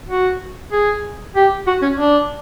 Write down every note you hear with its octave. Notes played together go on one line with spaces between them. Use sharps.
F#4
G#4
G4
F#4
C#4
D4